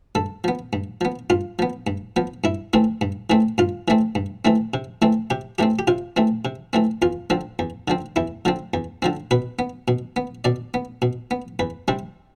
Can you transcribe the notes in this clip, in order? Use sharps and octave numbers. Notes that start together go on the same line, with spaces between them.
G2 A4
F3 B3
G2
F3 B3
G2 F4
F3 B3
G2
F3 B3
G2 E4
E3 A3 C4
G2
E3 A3 C4
G2 F4
E3 A3 C4
G2
E3 A3 C4
C3
E3 A3 C4
C3 G4
E3 A3 C4 G4
G4
C3 F4
E3 A3 C4
C3
E3 A3 C4
E2 F4
D3 F3 C4
E2
D3 F3 C4
E2 E4
D3 F3 C4
E2
D3 F3 C4
B2 B4
B3
B2
B3
B2 D5
B3
B2
B3
E2 B4
C3 G3 C4